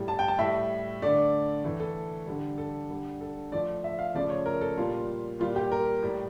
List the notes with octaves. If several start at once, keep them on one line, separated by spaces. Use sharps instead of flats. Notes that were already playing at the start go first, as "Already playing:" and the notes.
Already playing: A2 G3
A5
G5
A5
A2 G3 E5
D3 A3 D5
A2 E3 A3
A4
D3 G3
A4
D3 G3
A4
A2 F3 A3 D5
E5
F5
C#3 F3 A3 D5
C#5
A#4
A4
A#2 G3 F4
A#2 G3 F4
G4
A#4
A2 G3